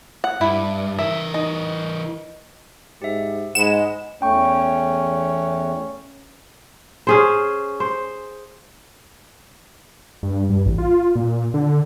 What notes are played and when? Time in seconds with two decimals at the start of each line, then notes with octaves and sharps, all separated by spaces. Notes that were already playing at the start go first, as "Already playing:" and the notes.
0.24 F#5
0.41 G2 E4
0.99 E3 A#4 E5
1.34 D#4
3.02 G#2 G4 E5
3.55 G#2 G#3 F#5 B5 E7
4.22 E2 A3 C#4 G5 C#6
7.07 C#4 G#4 C5
7.80 C5
10.23 G2
10.50 G2
10.66 A1
10.78 F4
11.16 A#2
11.54 D3